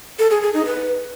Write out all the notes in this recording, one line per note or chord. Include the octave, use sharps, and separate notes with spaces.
A4
G#4
G#4
D#4
B4